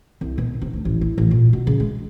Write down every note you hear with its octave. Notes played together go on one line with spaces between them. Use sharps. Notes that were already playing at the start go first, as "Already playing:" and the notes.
C2
B2
C3
D2
A1
E4
A1
A#2
B2
C#3
G#3